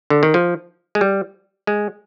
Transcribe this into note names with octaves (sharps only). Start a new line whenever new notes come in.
D3
D#3
F3
G#3
G3
G#3